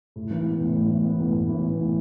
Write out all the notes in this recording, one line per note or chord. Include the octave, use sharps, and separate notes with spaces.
A2
E3
B3
A2
A2
E3
B3
A2
A2
E3
B3
A2